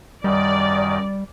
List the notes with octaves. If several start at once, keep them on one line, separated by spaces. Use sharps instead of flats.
F#2 D#3 G3 D5 D#5